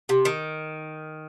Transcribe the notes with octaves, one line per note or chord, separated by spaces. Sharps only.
C3
D#3